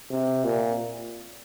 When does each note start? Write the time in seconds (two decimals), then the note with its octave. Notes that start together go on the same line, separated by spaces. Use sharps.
0.10 C3
0.44 A#2